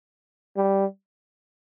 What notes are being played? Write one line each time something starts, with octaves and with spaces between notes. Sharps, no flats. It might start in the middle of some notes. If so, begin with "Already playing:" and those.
G3